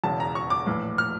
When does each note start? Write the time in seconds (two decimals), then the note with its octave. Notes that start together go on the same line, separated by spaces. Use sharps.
0.04 E1 E2 C#3 A5
0.20 A#5
0.35 C#6
0.50 D6
0.66 A#1 A2 E3
0.98 F6